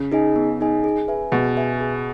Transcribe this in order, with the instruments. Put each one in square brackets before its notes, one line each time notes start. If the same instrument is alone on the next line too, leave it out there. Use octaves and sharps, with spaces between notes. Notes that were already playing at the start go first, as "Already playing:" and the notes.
Already playing: [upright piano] C#3
[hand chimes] D#4 G#4 D#5 G#5
B3
D#4 G#4 D#5 G#5
G#4
B4 E5 G#5
[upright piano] B2 [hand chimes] G#4
[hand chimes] B4 E5 G#5
G#4